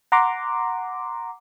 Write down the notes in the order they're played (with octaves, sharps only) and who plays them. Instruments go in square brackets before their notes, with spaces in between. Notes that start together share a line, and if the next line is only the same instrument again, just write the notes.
[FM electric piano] F#5 A#5 C6 D6